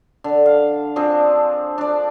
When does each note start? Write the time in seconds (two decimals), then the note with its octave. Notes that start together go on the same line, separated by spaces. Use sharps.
0.24 D3
0.46 F5
0.96 F3 C4 D4 G#4
1.78 D4 D5